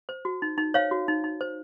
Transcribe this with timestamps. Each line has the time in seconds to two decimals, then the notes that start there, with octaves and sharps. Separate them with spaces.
0.09 C5
0.25 F#4
0.42 D#4
0.58 D#4
0.74 C5 C#5 F5
0.91 F#4
1.08 D#4
1.24 D#4
1.41 C5